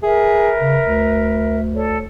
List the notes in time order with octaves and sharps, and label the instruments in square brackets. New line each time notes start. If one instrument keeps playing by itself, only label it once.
[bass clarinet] G#4 [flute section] A#4 B4 E5
[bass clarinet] C#3
D2
[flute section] A4 C#5 D5